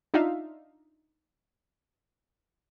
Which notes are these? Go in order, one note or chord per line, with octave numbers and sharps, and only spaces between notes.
D4 D#4 F4 E5 F5